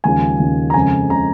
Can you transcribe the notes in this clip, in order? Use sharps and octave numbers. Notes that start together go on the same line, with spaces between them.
D#2 C#3 F3 G#3 G#5
D#2 C#3 F3 G#3
A#5
F2 C#3 G#3 G#5
C#3 G#3 A#5